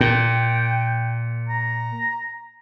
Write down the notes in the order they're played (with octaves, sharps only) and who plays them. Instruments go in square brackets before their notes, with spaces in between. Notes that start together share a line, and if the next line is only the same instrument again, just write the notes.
[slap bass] A#2 [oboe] G5
[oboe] A#5